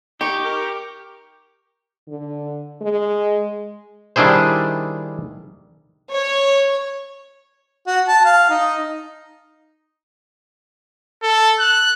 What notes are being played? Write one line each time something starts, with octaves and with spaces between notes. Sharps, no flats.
D#4 G4 C#6
A#4
D3
G#3
D#3 G3 D4 E4 G#4 C5
C#5
F#4
A5
F5
D#4
A4
F#6